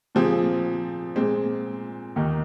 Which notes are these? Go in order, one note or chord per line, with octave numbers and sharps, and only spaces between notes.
A#2 F3 C4 G#4
A#2 G#3 C4
D#2 D#3 A#3 D#4